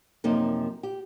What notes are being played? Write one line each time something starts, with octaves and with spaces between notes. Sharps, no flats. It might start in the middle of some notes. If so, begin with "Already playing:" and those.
F#2 C3 F3 A#3 D#4
G4